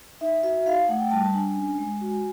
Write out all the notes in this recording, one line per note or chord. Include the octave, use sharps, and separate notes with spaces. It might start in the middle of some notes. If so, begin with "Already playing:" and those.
D#4 E5
F#4 E5
D#4 F5
A3 F#5
G5
G3 A5
A5
D4 G#5
C#4
G#3
F#4